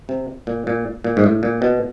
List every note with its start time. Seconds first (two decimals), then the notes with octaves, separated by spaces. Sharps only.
0.09 C3
0.47 A#2
0.67 A#2
1.04 A#2
1.17 G#2
1.24 A2
1.43 A#2
1.62 B2